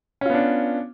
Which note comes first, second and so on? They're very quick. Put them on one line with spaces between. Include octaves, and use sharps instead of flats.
C#4 F4 B3 D4